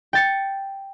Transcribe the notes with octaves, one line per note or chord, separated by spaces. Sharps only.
G5 A6 C#7